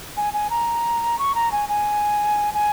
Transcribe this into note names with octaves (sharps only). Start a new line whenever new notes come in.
G#5
G#5
A#5
C#6
A#5
G#5
G#5
G#5